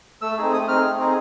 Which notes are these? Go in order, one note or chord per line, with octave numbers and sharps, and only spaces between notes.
A3 E6
C4 D#4 G#4
A3 D#6
C4 D#4 G#4 F6
A3
C4 D#4 G#4